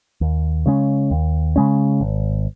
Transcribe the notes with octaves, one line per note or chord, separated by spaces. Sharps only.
D#2
C#3 G#3 C#4
D#2
C#3 G#3 C#4
G#1